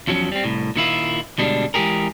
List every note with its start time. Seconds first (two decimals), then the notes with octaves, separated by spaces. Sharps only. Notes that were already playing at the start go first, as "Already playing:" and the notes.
0.07 E2 F3 F#3 C#4
0.32 G3 C4
0.44 C2 A2
0.76 A#2 D#3 E4 F4
1.38 D2 B2 G3 G#3 C#4 D4
1.74 E3 G#3 A3 G4 G#4 A#4